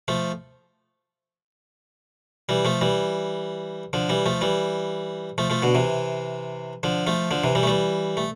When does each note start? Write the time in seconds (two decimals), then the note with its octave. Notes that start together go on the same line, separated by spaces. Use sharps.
0.08 F3 A3
2.49 E3 G3
2.65 F3 A3
2.81 E3 G3
3.93 D3 F3
4.09 E3 G3
4.26 F3 A3
4.41 E3 G3
5.38 F3 A3
5.50 F3 A3
5.62 B2 D3
5.75 C3 E3
6.83 D3 F3
7.07 F3 A3
7.31 D3 F3
7.44 C3 E3
7.55 E3 G3
7.63 A3
7.67 E3 G3
8.17 A3